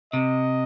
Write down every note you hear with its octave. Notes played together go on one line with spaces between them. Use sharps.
C3 D#5